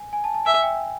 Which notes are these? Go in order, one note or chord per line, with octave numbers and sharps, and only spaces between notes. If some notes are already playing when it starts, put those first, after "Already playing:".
Already playing: G#5
G#5
A5
A5
E5 G#5
G5